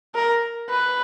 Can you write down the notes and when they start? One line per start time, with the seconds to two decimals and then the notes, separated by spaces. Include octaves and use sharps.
0.15 A#4
0.69 B4